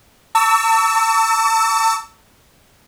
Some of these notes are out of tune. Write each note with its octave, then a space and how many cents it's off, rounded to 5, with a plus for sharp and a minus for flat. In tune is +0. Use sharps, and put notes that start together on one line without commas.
A5 +40 C#6 +45 E6 -10